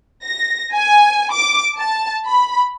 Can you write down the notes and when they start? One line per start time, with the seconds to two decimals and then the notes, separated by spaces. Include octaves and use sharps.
0.23 A#6
0.74 G#5
1.33 D6
1.78 A5
2.26 B5